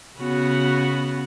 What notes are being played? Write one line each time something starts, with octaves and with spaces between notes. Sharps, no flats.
C#3 B3 F#4